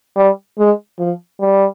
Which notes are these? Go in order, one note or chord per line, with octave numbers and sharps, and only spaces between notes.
G3
G#3
F3
G3